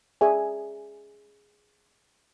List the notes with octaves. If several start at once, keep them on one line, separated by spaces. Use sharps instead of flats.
G#4 D5 E5 G#5